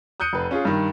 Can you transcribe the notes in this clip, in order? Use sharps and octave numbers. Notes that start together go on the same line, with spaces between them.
D#6 F#6 G6 C#7 D#7
F1 B4
C#4 F4 G#4
G2 D#3